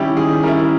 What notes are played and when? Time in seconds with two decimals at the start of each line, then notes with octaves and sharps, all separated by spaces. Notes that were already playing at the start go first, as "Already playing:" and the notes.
Already playing: D#3 G3 C#4 E4 G4
0.16 D#3 G#4
0.43 G3 C#4 E4 A#4